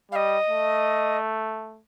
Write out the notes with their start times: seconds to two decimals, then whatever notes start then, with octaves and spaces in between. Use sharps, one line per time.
0.12 G3 F5
0.15 D#5
0.49 A3